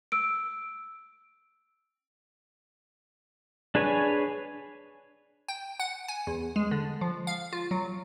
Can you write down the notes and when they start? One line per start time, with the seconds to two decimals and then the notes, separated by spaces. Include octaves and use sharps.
0.12 E6 D7
3.75 D4 G#4 B4 C#5 G#5
5.48 G5
5.80 F#5
6.08 G#5
6.27 E2
6.56 G#3
6.71 D3
7.01 F3
7.27 F5
7.53 F4
7.71 F#3